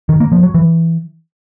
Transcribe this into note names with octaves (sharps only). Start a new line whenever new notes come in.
D#3
A#3
F3
F#3
E3